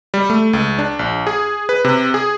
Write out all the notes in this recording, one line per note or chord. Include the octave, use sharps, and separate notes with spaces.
G3
A3
C#2
D4
A#1
G#4
B4
C3
G#4